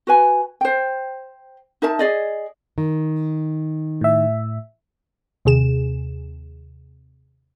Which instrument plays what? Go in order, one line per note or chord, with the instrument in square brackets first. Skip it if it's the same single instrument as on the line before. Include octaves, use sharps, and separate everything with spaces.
[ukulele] F#4 B4 G#5
C5 G5
D#4 A#4 E5 A5
G#4 D5 D#5
[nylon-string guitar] D#3
[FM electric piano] A2 E5
[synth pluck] D#2 C3 G#4 E7